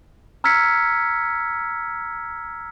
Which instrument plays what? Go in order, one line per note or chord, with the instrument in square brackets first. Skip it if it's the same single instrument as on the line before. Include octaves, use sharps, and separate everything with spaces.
[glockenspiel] A#5 E6 F6 G#6 B6 C#7